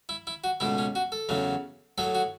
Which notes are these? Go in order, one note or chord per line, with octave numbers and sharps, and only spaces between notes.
E4
E4
F#4
C#2 B2 A3 E4
C#4
F#4
A4
E2 C#3 F#3 A3
A2 F#3 A3 A4
F#4